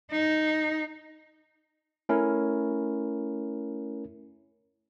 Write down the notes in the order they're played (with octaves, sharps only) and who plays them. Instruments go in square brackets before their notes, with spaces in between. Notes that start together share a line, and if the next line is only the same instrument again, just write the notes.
[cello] D#4
[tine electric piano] A3 C#4 E4 A#4